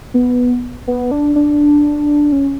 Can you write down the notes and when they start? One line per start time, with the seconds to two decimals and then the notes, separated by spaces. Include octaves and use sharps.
0.14 B3
0.87 B3
1.11 D4
1.36 D4
2.32 C#4